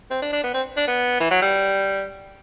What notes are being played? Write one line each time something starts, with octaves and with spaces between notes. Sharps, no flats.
C4
D4
D4
B3
C4
D4
B3
E3
F#3
G3